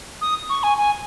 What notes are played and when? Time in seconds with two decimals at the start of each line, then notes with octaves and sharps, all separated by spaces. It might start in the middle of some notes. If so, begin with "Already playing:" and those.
0.21 D#6
0.50 C#6
0.63 G#5
0.78 G#5